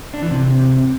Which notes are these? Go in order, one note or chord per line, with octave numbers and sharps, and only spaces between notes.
D4
E3
C3